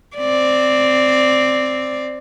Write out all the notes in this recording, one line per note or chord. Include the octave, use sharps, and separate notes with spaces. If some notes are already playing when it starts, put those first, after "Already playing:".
C4 D5